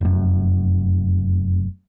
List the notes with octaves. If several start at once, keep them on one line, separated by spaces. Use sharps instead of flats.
F1 F#2